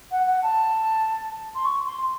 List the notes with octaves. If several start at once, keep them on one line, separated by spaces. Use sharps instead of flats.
F#5
F#5
A5
C6
C#6
C6